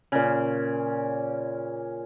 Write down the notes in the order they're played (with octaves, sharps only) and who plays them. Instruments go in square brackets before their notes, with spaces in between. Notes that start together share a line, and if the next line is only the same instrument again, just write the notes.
[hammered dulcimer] A#2 C#3